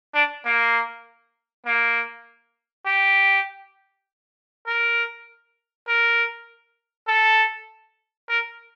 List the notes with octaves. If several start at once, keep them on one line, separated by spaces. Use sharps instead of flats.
D4
A#3
A#3
G4
A#4
A#4
A4
A#4